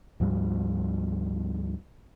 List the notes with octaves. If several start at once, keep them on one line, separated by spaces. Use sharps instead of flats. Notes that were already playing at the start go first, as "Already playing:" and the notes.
D2 G#2 F3 G3